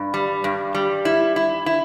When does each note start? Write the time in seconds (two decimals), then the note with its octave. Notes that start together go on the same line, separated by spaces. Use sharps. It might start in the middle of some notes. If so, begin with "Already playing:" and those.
Already playing: G2
0.14 G3
0.44 G2
0.75 G3
1.05 E4
1.36 E4
1.66 E4